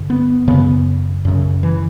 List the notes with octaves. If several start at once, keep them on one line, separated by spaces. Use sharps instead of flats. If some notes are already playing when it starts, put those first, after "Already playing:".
Already playing: G2 D3
B3
F#2 C#3 B3
F#2 C#3
E3